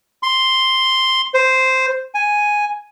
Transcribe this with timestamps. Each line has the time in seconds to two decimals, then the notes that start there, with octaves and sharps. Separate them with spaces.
0.23 C6
1.34 C5
2.15 G#5